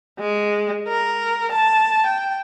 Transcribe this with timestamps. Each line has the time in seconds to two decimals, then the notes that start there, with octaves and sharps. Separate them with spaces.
0.19 G#3
0.88 A#4
1.51 A5
2.06 G5